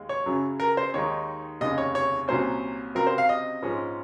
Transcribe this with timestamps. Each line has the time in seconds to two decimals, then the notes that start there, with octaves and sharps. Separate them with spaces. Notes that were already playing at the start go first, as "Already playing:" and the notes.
Already playing: D#2 G#3
0.09 C#5
0.26 F#2 C#3 F#3
0.60 A#4
0.77 C5
0.94 D#2 D#3 G#3 D#4 C#5
1.61 F1 D#2 C#3 D#5
1.78 C#5
1.95 C#5
2.28 C2 A#2 F#3 C#4 C5
2.95 C#2 C3 F#3 C4 A#4
3.07 C5
3.18 F5
3.29 D#5
3.63 A#1 G#2 F3 G#3 C#4